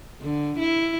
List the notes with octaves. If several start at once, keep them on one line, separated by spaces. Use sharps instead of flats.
D3
E4